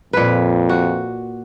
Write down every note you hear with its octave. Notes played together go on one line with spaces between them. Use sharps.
F2 A#2 B4
F#4